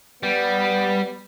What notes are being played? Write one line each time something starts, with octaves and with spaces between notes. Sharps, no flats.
G3 B3